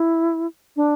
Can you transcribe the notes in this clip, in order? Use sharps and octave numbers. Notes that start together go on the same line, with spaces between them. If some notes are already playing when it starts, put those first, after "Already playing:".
Already playing: E4
D4